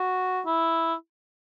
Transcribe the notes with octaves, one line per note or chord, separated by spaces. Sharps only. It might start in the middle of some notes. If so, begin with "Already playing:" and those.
Already playing: F#4
E4